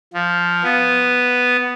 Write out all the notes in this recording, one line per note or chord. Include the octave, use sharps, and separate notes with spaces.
F3
B3